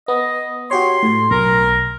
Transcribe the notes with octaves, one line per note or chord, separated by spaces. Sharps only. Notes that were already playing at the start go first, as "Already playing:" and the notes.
B3 D#5
F#4 G4 C#5 C6
A2
B1 A#4